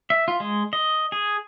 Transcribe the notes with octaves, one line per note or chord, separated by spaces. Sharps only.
E5
F4
G#3
D#5
G#4